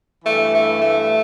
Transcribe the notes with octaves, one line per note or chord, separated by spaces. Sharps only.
G2 E3 A3
A3
A3